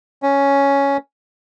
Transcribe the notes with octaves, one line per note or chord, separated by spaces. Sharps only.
C#4